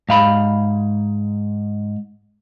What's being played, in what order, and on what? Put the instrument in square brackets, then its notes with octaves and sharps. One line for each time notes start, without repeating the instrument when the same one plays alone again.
[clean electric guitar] G#2 F5 B5